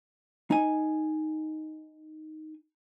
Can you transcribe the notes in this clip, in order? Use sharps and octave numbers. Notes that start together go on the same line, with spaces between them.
D#4 G#5